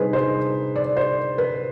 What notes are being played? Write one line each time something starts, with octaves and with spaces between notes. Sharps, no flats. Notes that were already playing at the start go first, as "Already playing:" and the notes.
Already playing: C3 G3 D4 D#4 G#4 B4 C5
C5
D5
C5
B4